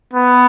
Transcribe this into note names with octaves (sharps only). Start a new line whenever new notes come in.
B3